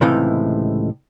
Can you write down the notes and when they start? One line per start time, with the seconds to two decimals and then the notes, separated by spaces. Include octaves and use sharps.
0.01 C#2 A2 C3 E3 D#4 F5